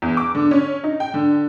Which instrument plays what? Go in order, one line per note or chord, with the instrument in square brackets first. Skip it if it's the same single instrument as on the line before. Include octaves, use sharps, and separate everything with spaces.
[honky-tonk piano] E2
D6
D3
C#4
D#4
G5
D3